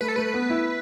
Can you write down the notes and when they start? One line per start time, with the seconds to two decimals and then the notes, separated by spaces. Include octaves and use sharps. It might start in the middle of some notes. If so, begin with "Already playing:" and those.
0.01 A3 B4
0.08 A4
0.16 A3 B4
0.34 B3
0.50 E4